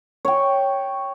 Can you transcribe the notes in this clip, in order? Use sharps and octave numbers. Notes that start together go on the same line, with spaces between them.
C#5 G5